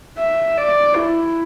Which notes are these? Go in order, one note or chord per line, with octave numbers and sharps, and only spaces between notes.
E5
D5
E4